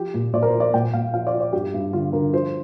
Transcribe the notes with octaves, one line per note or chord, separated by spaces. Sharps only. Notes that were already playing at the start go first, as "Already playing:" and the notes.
Already playing: F3 G4
A#2
A#2 D5
A#4
C5
F3
D5
A#2 G5
A#2 F5
F3 F5
D5
F3
D5
G2 G4
G2
D3 F4
D3 A#4
F3 C5